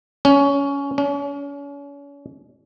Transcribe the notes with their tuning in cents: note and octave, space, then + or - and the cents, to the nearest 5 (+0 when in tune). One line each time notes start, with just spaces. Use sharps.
C#4 +20
C#4 +40